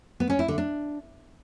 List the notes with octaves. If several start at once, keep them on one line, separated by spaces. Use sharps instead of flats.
B3
C#4
E4
D3
D4